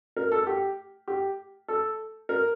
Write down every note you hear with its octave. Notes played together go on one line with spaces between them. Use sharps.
A#4
A4
G4
G4
A4
A#4